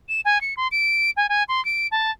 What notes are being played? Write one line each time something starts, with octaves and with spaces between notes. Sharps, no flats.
E7
G#5
C#7
C6
D7
G#5
G#5
C6
D7
A5